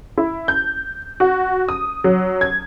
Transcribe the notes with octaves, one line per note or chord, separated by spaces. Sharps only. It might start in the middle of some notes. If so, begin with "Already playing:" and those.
E4
G6
F#4
D#6
F#3
G#6